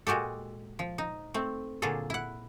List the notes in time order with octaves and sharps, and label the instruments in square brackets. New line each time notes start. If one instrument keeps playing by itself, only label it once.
[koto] A#2 G#3 F#4 G4 A4
F3
D#4
A3 C4
A#2 D3 F#3 F4 G#4 A4
E4 F#5